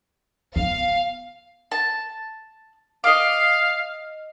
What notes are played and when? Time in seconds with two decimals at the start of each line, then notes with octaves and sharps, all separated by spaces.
0.56 B3 F5
1.72 A5
3.04 D#5 F5 D6